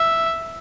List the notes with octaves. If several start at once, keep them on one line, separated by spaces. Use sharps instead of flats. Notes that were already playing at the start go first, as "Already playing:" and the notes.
Already playing: E5